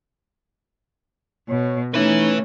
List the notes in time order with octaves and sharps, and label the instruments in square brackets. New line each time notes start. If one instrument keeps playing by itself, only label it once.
[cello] B2 [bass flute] C#5
[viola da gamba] A3 [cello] C#4 [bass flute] D#4 [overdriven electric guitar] B4 E5